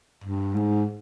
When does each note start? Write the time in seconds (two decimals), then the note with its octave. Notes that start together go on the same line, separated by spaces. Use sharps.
0.24 G2
0.56 G#2